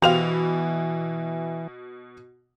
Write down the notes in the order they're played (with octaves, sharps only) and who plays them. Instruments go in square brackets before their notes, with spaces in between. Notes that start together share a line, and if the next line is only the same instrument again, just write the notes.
[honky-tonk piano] B2 F7 [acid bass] E3 [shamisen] G4 C5 F5